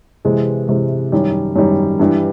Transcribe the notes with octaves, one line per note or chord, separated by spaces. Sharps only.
C3 E3 G#3
C3 E3 G#3
F#2 D#3 G3
F#2 D#3 G3
G2 E3 G3